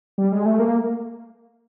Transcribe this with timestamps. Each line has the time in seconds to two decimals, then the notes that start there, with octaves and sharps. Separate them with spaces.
0.18 G3
0.32 G#3
0.46 A3
0.59 A#3